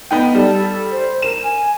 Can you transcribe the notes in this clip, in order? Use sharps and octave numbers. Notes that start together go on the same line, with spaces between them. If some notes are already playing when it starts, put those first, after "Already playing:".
B3 D#4 G5
G3 A4
C5
A#4 E7
G#5